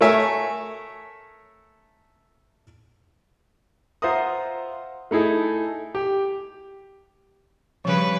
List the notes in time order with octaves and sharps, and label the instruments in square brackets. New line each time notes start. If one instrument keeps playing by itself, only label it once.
[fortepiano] A3 A4 A#4 C#5 E5 G#5
[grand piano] F4 C5 E5 F#5 A#5 D#6
A3 D#4 E4 G#4 A4
G4
[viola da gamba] C#3 G3 B4 [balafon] F3